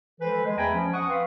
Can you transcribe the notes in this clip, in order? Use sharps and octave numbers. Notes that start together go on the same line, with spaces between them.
E3 F3 G#3 A4 B4 C5
G#3
E2 A3 G5 G#5 A#5 B5
F3 C#4
F#5 C#6 D#6
C4 B4 F5